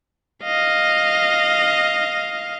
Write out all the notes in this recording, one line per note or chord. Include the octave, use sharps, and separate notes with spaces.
D#5 F5